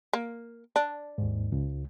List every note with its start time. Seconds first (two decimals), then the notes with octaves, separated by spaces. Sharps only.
0.13 A#3
0.76 D4
1.18 D#2 G#2
1.52 C#2